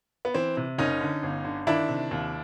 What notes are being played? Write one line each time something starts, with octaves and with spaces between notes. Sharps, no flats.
B3
E3 C4
C3
F#1 C#4 D#4
D3
G1
D3
D#3 D4 E4
C3
D#2